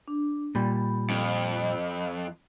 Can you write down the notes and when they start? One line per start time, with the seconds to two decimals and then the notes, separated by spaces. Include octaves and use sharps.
0.08 D4
0.55 A#2 G3 B5
1.10 F2